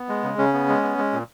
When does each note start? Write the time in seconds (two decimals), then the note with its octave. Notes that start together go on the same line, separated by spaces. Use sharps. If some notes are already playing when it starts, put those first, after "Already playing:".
Already playing: B3
0.09 G#3
0.23 C#3
0.38 C#3 C#4
0.53 B3
0.68 G#3
0.83 B3
0.98 G#3
1.13 A#2